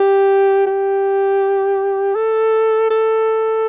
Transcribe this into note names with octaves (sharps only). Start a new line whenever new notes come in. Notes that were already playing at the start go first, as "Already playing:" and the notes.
Already playing: G4
G4
A4
A4